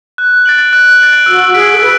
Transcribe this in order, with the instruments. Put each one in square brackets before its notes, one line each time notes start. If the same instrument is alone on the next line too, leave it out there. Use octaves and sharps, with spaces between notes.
[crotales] F#6
A6 D7 F#7
F#6
A6 D7 F#7
[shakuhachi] F#4 [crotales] E6
[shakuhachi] G#4 [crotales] B6 D7
[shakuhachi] A4
[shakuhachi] B4 [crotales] E6